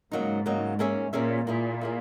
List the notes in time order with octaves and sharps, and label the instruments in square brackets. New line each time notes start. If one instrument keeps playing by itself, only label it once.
[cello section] G#2 [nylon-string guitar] C#3 F#3 A#3 D#4
[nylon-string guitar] C#3 F#3 A#3 D#4
A#3 C#4 G#4 C#5 E5
[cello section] A#2 [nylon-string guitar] A#3 C#4 G#4 C#5 E5
[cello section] A#2 [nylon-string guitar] A#3 E4 G#4
[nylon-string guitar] A#3 E4 G#4